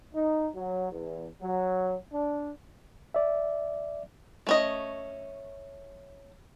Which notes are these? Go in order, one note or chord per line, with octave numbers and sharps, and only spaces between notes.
D#4
F#3
E2
F#3
D4
D5 E5
A3 C#4 D#5